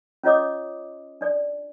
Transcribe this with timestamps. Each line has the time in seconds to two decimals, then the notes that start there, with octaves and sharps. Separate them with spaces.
0.23 C#4 F4 C#5 D#5 D6 D#6
1.21 D4 D5